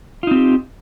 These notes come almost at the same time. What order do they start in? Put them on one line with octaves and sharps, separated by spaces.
F4 D#4 C4 G4